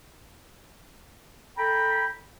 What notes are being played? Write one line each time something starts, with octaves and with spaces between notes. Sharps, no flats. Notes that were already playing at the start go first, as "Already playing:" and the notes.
A4 G5 A#5 B5